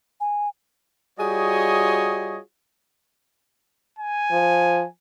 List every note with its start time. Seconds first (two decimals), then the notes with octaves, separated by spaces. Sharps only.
0.20 G#5
1.19 G3 F4 F#4 G#4 C#5 D#5
3.99 G#5
4.32 F3